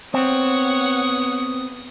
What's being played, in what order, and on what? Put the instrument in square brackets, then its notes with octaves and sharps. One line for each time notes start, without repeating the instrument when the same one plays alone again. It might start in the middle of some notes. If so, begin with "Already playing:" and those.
[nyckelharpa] B3 D#6 [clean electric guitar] C4 [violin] C#5 F#5